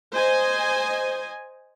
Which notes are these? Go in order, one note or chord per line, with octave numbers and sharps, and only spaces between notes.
C5 D#5 G#5